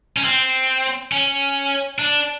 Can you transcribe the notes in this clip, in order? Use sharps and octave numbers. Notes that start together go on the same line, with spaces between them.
C#4
C4
C#4
D4